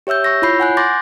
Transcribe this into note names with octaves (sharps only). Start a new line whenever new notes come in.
G4 C#5 E5 E6 G6
C#6 E6 A#6
E4 F4 C#5 B5 G6 C7
F#5 G#5 F#6
C6 D6 G6 A6 A#6